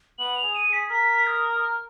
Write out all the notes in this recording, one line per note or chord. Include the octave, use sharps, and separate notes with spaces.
B3 F#7
F7
G#4
D#7
G#4
B6
A#4 B6
D#6
F6